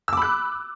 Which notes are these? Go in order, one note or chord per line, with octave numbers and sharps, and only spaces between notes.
B5 D6 E6 F#6